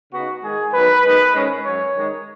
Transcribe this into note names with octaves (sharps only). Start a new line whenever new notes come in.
C#3 B3 D#4 F#4
D#3 G#3 D#4 G#4
D#3 F#3 B3 D#4 B4
F#2 D#3 G#3 B3 D#4
G#2 D#3 G#3 C#4
F#2 F#3 C#4 C#5
D#3 G#3 D#4